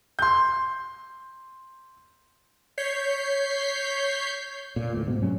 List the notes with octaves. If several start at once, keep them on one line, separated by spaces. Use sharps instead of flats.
C6 G6
C#5 G6 B6 C7
A#2
D2 A2
G#2 B2
G2 F#3 C#4